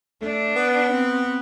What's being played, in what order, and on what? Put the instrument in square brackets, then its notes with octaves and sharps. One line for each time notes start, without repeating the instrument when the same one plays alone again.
[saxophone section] A3 [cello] D4
[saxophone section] B3
[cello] C4